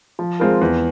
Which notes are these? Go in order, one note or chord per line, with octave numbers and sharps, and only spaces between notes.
F3
G#3 C4 F4 A#4
E2